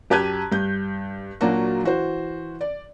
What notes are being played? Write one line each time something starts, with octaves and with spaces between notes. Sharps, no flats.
F#2 G4 A5 F#6 G#6 D#7
G2 G6
A#2 F#3 A#3 D4 F#4
E3 F#4 C5
D5